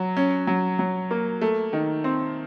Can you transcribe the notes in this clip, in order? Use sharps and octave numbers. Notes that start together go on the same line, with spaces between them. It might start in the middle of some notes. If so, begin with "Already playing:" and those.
Already playing: F#3
C#4
F#3
F#3
A#3
A3
D#3
C4